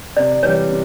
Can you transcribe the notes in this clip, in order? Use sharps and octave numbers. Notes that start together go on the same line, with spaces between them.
C3 D5
E3 G3 C#5
C3